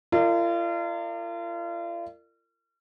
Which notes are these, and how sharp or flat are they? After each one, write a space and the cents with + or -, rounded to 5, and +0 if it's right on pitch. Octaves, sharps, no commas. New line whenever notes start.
F4 -40 A#4 -40 D5 +35